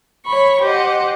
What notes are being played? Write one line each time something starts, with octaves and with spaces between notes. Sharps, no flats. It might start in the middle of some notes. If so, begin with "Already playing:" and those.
C#5 B5 C#6
G4 C5 D#5 F#5